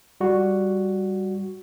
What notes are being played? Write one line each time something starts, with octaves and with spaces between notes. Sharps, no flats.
G3 F#4